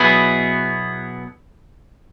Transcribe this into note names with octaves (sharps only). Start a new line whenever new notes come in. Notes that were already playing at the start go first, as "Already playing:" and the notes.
Already playing: B2 F#3 B3 E4 G#4 B5